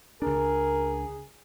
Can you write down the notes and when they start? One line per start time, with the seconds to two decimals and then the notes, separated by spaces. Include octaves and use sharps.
0.22 C#2 D4 G#4 A#4